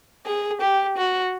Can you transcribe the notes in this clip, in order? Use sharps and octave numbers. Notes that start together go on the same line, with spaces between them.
G#4
G4
F#4